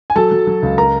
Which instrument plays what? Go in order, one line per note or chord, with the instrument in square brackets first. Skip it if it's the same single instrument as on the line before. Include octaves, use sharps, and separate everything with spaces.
[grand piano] G#5
F#3 A4 A5
F#3
F#3
C#2
A#4 A#5